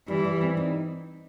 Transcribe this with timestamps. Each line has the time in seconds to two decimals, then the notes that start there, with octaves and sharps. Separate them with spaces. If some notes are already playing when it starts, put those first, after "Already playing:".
0.08 E3 G3
0.25 G3
0.41 C4
0.57 D#4